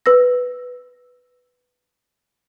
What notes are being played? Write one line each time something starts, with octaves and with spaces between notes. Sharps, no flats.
B4 E6 A#6